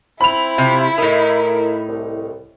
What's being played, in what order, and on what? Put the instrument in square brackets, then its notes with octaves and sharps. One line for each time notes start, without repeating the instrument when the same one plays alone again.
[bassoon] C4 [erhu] E4 [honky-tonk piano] B5 F7
[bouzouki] C3 F4
[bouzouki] A2 D#4 [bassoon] A#4
[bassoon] C2